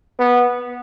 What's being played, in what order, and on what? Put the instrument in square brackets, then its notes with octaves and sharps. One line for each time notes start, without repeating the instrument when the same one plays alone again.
[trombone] B3